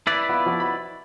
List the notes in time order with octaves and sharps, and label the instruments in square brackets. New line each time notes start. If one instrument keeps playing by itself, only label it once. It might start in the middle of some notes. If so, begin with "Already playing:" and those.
[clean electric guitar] E4 B4 D5
[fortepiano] B3 F4
F3 F#4
B5